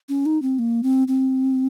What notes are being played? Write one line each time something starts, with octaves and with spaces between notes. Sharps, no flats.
C#4
D#4
C4
A#3
C4
C4